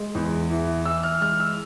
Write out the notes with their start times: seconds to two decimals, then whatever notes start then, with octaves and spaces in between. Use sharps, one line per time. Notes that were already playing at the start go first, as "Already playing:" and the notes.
Already playing: G#3
0.15 E2
0.50 E3
0.85 E3 E6
1.03 F6
1.21 G#3 F6
1.40 E6